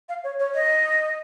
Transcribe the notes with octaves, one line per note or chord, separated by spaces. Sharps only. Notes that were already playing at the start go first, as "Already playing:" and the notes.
F5
C#5
C#5
D#5